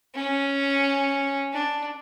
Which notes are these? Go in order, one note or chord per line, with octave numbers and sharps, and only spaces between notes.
C#4
D4